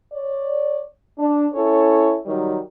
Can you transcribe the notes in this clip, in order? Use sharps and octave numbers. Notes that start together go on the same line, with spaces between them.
C#5 D5
D4
C#4 E4 A4 C#5
D#3 F#3 G3